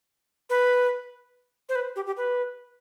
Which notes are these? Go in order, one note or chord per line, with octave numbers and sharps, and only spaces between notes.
B4
C5
B4
G4
G4
B4